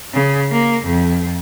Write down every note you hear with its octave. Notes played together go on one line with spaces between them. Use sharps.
C#3
A#3
F2